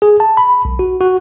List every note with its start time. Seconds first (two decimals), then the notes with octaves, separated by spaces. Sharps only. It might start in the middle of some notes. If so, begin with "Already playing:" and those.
0.02 G#4
0.20 A5
0.37 B5
0.65 B1
0.79 F#4
1.01 F#4